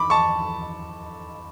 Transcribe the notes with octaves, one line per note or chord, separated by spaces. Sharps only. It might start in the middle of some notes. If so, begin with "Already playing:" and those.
Already playing: B5 D6
A5 C#6